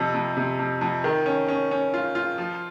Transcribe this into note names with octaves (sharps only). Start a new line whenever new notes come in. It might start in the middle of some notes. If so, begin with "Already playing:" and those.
Already playing: F2 C3
F2
C3
F2
F2
D#3
C#4
C#4
C#4
F4
F4
F3